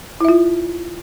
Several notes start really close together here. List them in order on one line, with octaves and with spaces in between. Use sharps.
E4 E5 F4